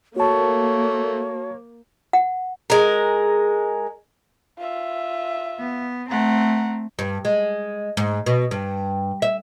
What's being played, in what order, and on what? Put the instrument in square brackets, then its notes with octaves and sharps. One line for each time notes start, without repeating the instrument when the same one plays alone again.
[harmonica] A3 [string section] A#3 [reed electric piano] F#4 A5 [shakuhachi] C#5
[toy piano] F#5
[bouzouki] G#3 A#4
[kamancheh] F4 E5
[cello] B3
[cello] A3 C4 [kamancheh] F#5 A#5
[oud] G2
G#3
G#2
B2
G2
E5